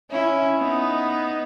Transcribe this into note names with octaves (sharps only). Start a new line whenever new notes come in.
C#4 E4
B3 D#4